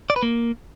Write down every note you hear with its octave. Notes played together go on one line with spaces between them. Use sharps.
D5
B4
A#3